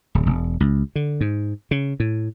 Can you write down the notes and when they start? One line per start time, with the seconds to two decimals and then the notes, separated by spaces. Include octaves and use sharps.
0.15 D1
0.26 E1
0.60 C#2
0.96 D3
1.21 G#2
1.71 C#3
2.00 A2